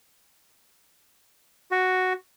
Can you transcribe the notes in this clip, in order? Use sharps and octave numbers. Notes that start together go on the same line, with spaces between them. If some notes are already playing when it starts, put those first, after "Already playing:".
F#4